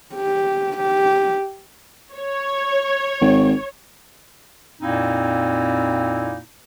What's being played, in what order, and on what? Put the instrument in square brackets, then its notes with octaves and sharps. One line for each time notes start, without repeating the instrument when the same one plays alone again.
[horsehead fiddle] G4
G4
[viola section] C#5
[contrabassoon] G#1
[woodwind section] F2 A#2 A#3 C4 D#4 E4